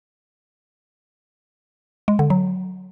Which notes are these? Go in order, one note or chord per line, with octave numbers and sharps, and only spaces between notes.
G#3
D3
F#3